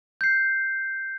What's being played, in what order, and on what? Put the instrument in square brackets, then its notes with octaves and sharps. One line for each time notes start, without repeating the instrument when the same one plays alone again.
[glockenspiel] G6 C7